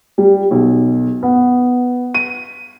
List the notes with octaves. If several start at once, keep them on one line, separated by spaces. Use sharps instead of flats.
G3
B1
B3
D#7